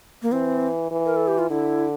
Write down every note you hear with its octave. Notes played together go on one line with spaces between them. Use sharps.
A#3
E3 C4
E3
A#4
A4
G4
F4
D3 E4